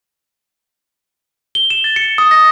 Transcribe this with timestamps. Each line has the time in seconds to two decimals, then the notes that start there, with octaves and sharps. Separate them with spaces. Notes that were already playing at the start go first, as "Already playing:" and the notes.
1.55 G7
1.70 E7
1.84 A6
1.96 C#7
2.18 D#6
2.31 A#6